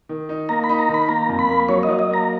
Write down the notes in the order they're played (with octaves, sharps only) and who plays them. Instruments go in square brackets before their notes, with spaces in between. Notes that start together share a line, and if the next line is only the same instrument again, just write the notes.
[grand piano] D#3
D#4
[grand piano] A#3 [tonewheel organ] A#5
[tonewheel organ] B5
[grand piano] D#4
[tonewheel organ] A#5
[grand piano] D#3
[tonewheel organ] B5
[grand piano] A#3 [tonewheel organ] A#5
[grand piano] F2
[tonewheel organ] B5
[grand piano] A#3
[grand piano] F#3 [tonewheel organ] C#5
[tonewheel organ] D#5
[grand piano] F#3
[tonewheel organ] D#5
[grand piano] A#3 [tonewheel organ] A#5